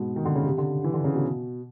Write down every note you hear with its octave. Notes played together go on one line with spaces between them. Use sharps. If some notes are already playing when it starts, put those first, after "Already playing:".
Already playing: G#2 B2
D#3
D3
C#3
C3
D3
E3
D3
C#3
B2